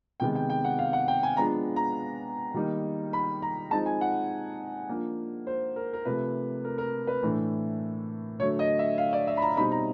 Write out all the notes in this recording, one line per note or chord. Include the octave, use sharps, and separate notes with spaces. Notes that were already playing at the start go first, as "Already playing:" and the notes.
C3 D#3 G#3 B3 G5
G5
G5
F#5
F5
F#5
G5
G#5
F3 G#3 B3 D4 A#5
A#5
D#3 G3 A#3 D#4
B5
A#5
F3 G#3 C4 D#4 A5
G#5
F#5
F3 A#3 D4
C5
A#4
A#4
C3 F3 A3 B4
A#4
A#4
B4
A2 E3 A3 D4
D3 F#3 A3 C#5
D#5
E5
F5
D5
E5
B5
A#5
B2 G3 C4 D#4 B5
A#5